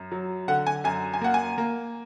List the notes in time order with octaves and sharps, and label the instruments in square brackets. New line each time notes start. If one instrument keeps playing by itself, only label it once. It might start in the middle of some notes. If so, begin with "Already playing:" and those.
Already playing: [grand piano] F#2
F#3
D3 F#5
G#5
F#2 G#5
G#5
A#3 F#5
G#5
A#3